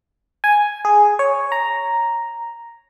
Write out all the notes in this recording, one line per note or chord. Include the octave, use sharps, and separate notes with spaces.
G#5
G#4
C#5
A#5